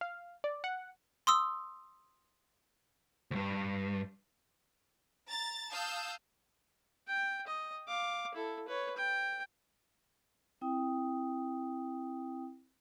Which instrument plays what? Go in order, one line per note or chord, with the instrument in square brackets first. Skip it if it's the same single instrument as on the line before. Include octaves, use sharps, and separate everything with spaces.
[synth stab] F5
D5
F#5
[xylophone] C6 D#6 E6
[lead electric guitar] D2 G2
[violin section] A#5 A6
F5 A5 D#6 E6 G6
[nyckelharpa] G5
D#5
F5 D6
E4 A4
B4 C#5
G5
[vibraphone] C4 E4 G5 D#6